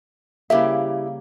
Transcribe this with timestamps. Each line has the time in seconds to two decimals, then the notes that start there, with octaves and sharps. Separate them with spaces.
0.50 C#3 G3 A#3 E4 G4 E5